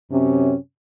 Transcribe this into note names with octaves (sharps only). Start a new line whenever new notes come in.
F#2 C3 C#4